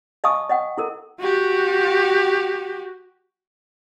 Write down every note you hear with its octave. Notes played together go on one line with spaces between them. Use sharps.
D#5 F5 G#5 A5 C#6 D#6
D#5 F#5 G5
E4 A4 A#4
F#4 G4